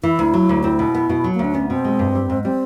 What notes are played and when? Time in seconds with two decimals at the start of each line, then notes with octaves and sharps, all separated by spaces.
0.03 E3 E4
0.19 D2
0.34 F#3
0.49 D2
0.64 C4 E4
0.79 B2
0.94 B3
1.09 B2
1.24 F#3
1.34 D2 A#3
1.45 D4
1.54 B3 C#4
1.69 B2 C4
1.84 G#3
1.99 G2
2.15 G3
2.30 G#2
2.44 G3 C4